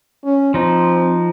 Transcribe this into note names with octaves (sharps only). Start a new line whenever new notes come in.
C#4
F3 C4 D#4